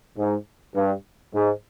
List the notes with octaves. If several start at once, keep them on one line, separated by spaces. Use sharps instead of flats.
G#2
G2
G#2